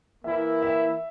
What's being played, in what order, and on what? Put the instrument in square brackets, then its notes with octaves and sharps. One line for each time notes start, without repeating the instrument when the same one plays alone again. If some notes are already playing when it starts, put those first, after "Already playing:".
[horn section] E3 A#3 E4 A#4 [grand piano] E5
[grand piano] E5